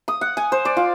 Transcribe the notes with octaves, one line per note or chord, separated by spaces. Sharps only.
D#6
F#5
G#5
C5
D5
F4